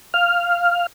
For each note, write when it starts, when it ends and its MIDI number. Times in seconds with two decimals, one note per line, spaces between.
0.14 0.86 77
0.14 0.86 89